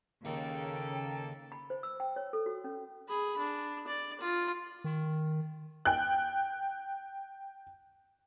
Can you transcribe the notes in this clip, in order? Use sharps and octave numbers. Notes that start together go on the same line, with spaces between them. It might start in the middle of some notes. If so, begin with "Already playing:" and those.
D#2 C#3 A#3 A4 G5
B5
C5
E6
G5
C#5
A4
F#4
C#4
G#4 B5
D4
D5
F4
D#3
G5 F#6